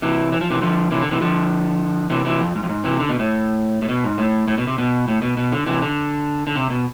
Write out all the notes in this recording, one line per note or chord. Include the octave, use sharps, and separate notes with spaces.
C3 E3
E3
F3
C3 E3
D3 F3
C3 E3
D3
C3 E3
D3 F3
C3 E3
C3 E3
F2
G#2
F2
G#2
C3 E3
D3
B2
A2
A2
B2
G#2
A2
A2
B2
C3
B2
A2
B2
B2
D3
C3 E3
D3
D3
C3
B2